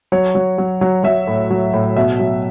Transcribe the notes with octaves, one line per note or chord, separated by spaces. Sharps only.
F#3 C#5
F#3
F#3
F#3
F#3 E5
A2
F#3
A2
B2 E5
F#3